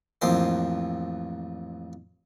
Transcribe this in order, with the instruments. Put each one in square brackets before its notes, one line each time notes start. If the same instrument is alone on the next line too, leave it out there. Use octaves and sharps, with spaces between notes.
[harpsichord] A1 F2 A#3 C5